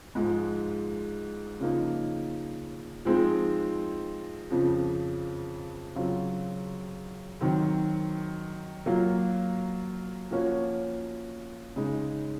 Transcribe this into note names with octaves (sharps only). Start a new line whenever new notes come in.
G#2 F3 G#3
C#3 F3 A#3 D#4
F3 G#3 C4 D#4
F2 C#3 F3
C#3 F#3 C4 F4
D#3 F#3 C4
F#3 A#3 F4
F3 A#3 C#4 F#4 C#5
C#3 G#3 D#4